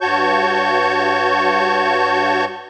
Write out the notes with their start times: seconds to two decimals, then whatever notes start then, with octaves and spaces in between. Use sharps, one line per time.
0.01 G2 F#4 C#5 A5 C#6 G6